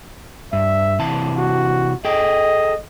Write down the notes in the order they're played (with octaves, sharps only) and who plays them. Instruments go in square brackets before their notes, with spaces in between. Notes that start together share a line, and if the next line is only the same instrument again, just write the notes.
[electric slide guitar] G2 [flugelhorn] E5
[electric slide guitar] C3 E3 A5
[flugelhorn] F#4
[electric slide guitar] G#4 A4 G5 [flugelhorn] D#5